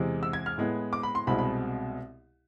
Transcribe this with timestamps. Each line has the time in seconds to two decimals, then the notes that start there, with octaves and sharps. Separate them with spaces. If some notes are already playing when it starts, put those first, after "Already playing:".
Already playing: E2 C3 G#3
0.23 E6
0.33 G#6
0.46 F6
0.58 A2 G#3 B3
0.93 D6
1.03 B5
1.15 C6
1.27 C2 B2 G#3 C4 B5
1.39 B5